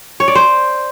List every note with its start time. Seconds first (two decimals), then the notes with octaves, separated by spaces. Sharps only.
0.20 C#5
0.28 D5
0.35 C5